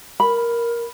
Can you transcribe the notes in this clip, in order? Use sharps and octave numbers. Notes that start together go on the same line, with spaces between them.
A#4 B5